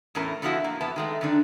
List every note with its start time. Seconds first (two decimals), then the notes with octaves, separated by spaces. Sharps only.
0.15 E2 A2 C#4 A#4 A5
0.42 D3 F3 B3 E4 F#4
0.64 A#3
0.81 F2 B3 E4 A5
0.96 D#3 G#3 A3
1.21 F#2 D3 D#3 D4